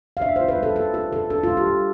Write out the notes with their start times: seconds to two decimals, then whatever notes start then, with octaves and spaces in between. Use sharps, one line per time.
0.17 F5
0.22 D4 E5
0.36 F4 C5
0.48 B4
0.58 G3 A4
0.76 F4 A4
0.94 F4 A4
1.12 F4 A4
1.30 D4 A4
1.44 G3 F4
1.57 G4
1.66 G3